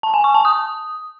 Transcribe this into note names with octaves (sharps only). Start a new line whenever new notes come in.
A5
G#5
C#6
A5
D#6